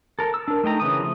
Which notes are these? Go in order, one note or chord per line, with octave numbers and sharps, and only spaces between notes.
A4 A#4
E6
D4 A#4
A3 D#4 G5 A#5
C#3 E3 D#6
F3 A3